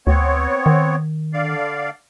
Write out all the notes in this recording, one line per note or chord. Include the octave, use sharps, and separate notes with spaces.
D2 B3 C4 C#5
D#3
D3 D5 F5